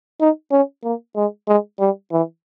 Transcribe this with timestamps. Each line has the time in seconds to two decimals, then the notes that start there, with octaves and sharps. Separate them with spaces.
0.20 D#4
0.51 C#4
0.83 A#3
1.16 G#3
1.47 G#3
1.79 G3
2.11 E3